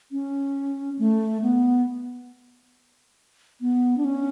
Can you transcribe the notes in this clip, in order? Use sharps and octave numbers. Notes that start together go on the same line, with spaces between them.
C#4
A3
B3
B3
D4
C#4